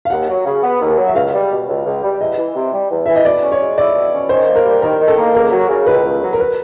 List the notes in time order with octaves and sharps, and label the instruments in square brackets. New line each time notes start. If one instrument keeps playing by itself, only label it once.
[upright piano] F5
[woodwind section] D#2 [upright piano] F#5
[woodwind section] F#3
C#3
B3
D#2
F#3
[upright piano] E5
[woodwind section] C#2 [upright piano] F5
[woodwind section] G3
B2
C#2
C#2
G3
[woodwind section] E2 [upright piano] D#5
[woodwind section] E3
C3
G3
E2
[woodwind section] E3 [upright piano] E5
[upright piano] D#5
[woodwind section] B2 [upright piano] D5
[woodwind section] C#4
[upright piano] C#5
[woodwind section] G#3
[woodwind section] E4 [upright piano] D5
[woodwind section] B2
C#4
[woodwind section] D#3 [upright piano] C5
[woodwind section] A#3
[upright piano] A#4
[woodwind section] G3
[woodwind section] D#3 [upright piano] A#4
[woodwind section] D#3
[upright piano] A4
[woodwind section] A#3
[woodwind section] C#2 [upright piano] A#4
[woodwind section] F#3
C#3
[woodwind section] C#2 [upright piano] B4
[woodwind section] C#2
F#3
[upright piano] A#4
B4